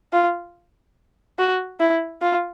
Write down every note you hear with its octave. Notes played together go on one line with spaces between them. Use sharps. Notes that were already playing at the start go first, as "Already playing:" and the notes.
F4
F#4
E4
F4